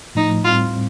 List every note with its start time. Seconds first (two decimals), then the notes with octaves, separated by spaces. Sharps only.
0.15 A2 F3 A3 D#4
0.44 A2 G3 C4 F4